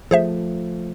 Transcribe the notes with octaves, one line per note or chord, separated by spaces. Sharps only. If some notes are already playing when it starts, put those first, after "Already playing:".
F3 A3 G#4 C5 E5